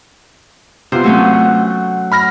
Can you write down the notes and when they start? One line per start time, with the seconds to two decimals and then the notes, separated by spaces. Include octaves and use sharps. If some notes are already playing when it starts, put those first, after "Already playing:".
0.92 C3 B3 F4 C5
1.04 F#3 A3 C#4
1.33 F#5
2.12 B5 F6 A#6